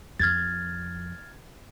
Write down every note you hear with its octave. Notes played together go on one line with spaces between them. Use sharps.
F2 F6 G#6 A6